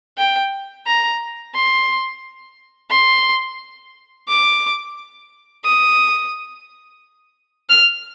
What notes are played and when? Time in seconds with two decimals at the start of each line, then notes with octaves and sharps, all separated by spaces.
0.18 G5
0.87 A#5
1.55 C6
2.91 C6
4.28 D6
5.64 D#6
7.69 F6